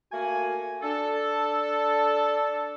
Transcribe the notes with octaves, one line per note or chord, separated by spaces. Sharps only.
A3 A#3 F#4 G#5
D4 A4